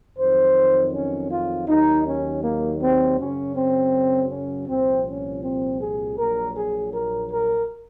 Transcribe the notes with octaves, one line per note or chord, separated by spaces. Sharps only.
F2 D#3 F#3 C5
C#4
F4
D#2 D#3 F#3 D#4
C#4
A#3
C4
F#2 C#3 F#3 C#4
C4
C#4
C2 A#2 F3 C4
C#4
C4
G#4
A#1 A#2 F#3 A#4
G#4
A#4
A#4